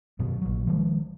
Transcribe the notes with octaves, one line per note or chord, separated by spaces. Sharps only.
F#2 B2 F#3
A#1 F#3
D#3 F3 G#3